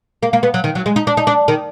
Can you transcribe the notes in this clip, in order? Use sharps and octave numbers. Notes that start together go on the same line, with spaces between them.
A#3
A#3
B3
F#3
D#3
F#3
G#3
D#4
D4
D#4
D4
D#3